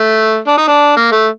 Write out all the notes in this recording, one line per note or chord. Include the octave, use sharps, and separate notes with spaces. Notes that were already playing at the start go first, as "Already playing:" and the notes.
Already playing: A3
D4
D#4
D4
A#3
A3